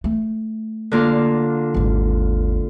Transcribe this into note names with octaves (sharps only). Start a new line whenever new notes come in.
A3
D3 A#3 F4
G#1 D#2